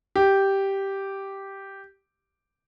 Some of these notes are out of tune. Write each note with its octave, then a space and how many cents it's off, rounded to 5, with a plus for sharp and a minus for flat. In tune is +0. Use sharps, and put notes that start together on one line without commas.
G4 -5